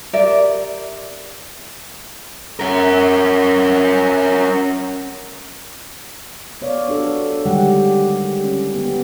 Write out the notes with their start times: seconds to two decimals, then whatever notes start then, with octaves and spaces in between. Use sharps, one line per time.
0.13 G4 A#4 D5 E5
2.59 C#4 A#4
6.61 B3 C#5 D5 F5
6.88 D4 F#4 A4
7.45 D3 D#3 G3 G#3 G4 F#5
8.44 C#4
8.74 B3 G4